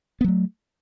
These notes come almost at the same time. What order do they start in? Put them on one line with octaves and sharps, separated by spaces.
B3 F#3 A3